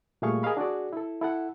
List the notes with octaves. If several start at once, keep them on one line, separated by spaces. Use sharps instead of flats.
A#2 G3 A3 G#4 F5 C#6
G#4 A#4 D#5 F5 B5
D4 F#4 G#4 D5
E4 A4
E4 A4 F#5